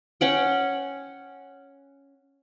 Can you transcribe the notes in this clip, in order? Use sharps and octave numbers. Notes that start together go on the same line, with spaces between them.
C#4 F#5 G5